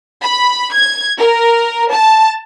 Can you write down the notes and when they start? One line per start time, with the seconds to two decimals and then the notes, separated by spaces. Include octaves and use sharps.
0.23 B5
0.73 G#6
1.20 A#4
1.92 A5